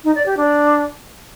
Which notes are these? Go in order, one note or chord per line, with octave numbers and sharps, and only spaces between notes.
D#4
D5
G4
D4